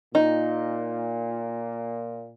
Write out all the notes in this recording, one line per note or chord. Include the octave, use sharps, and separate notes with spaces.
A#2 D#4